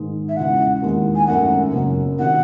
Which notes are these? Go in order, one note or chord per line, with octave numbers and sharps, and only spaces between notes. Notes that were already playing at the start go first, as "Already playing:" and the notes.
Already playing: G#2 D#3 G#3 D#4
E5
E2 C#3 G#3 F#5
D#2 D#3 G#3 C4 E4
G#5
G#1 F#2 D#3 A3 C4 F#5
F#1 F#2 C#3 F#3
C3 D#3 F#3 F#5